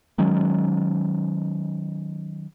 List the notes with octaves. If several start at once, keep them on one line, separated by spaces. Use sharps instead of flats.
D#3 F#3 G#3 C#4